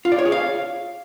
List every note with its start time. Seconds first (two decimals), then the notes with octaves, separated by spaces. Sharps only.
0.05 F4
0.12 D5
0.19 C#5
0.25 G#4
0.32 F5